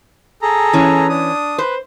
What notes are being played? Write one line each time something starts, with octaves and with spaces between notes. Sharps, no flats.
G#4 A4 A#5
E3 C#4
D4 D#6
B4 C5